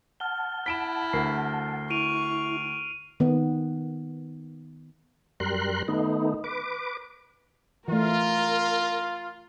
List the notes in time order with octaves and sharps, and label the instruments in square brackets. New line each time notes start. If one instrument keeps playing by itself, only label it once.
[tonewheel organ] F#5 A5 [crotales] F6 G7
[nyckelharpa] E4 [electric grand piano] B6 D7 E7 [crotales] G7
[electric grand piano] D2 A#4 [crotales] C7
[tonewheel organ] E4 [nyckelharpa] C#6 [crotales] D7 D#7 F7
[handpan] D#3 B3
[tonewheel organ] F#2 G3 A#4 C6 F#6
D#3 A3 B3 D#4
B4 D6
[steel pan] E3 A3 [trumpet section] F4 [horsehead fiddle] A#4